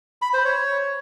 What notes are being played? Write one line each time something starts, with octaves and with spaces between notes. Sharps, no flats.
B5
C5
C#5